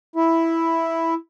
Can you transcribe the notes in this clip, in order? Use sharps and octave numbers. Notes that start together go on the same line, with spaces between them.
E4